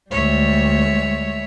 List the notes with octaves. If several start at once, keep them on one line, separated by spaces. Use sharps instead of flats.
D2 G3 G#3 C#5 E5